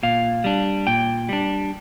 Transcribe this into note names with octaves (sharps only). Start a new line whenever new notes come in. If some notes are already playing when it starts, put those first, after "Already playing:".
A#2 F5
G3 D4
A#2 G5
G3 D4